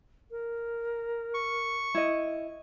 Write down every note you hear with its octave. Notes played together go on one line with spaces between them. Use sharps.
A#4
C#6
E4 D#5